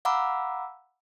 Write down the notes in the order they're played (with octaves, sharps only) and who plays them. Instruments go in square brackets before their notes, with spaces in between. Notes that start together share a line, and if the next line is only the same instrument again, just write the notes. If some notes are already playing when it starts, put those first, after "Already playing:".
[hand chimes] F5 F#5 A#5 B5 D6 E6